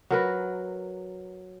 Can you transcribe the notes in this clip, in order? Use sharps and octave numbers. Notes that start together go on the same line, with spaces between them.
F#3 A#4 B4